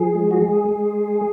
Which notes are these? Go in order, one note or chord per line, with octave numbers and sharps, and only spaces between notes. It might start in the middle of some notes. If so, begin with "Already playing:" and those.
Already playing: F3 G#4
G#3
F#4
G#3 G#4
G#3